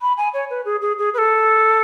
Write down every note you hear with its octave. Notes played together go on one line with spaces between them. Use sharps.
B5
G#5
C#5
B4
G#4
G#4
G#4
B4
A4